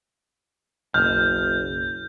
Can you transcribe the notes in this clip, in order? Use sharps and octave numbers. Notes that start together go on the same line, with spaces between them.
F#1 B1 F#2 F6 G6